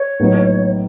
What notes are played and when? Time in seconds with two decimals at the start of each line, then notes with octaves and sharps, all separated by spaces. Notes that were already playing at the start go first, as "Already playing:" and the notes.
Already playing: C#5
0.20 A#1 A2 F#3 B3 D#4